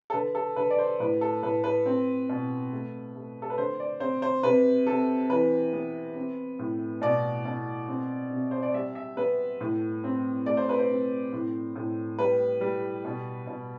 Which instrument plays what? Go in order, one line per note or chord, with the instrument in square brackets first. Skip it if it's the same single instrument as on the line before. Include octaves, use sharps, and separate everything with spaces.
[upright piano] A4
D3 B4
A4
D3 B4
D5
C5
A2 B4
A4
A2 B4
B4
C4
B2
A3
A3
A4
B4
D3 C5
D5
C4 C5
C5
C3 B4
C3 A4
E3 B4
B3
C4
A2
B2 D5
B2
C4
C3
C5
D5
G3 E5
E5
B3 B4
A2
C4
A3 D5
C5
B4
C5
C4
A2
A2
G3 B4
G3
B2
B2